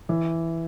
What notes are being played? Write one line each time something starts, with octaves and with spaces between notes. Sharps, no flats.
E3